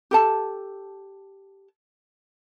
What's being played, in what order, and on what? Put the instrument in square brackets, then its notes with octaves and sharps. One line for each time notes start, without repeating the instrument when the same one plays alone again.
[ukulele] G4 A4 A5